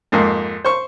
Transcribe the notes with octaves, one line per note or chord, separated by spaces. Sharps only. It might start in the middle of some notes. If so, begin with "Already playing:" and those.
F2 G#2 A#3
C5 C#6